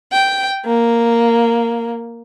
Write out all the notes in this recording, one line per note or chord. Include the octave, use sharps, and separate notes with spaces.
G5
A#3